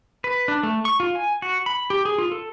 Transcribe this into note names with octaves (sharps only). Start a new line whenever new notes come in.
B4
D4
A3
C#6
F4
G#5
F#4
B5
G4
G#4
F4
A4